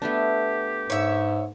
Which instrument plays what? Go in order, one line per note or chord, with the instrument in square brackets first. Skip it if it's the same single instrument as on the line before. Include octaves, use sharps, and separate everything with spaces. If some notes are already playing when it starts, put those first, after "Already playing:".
[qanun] A3 B3 D4 [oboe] G4
[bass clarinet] G#2 [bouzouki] C#5 E5